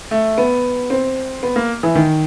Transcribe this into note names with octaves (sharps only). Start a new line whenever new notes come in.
A3
B3
C4
B3
A#3
E3
D#3